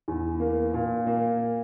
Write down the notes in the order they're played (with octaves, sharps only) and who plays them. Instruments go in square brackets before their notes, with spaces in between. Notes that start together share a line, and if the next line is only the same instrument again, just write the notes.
[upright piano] E2
A#3
A#2
A#3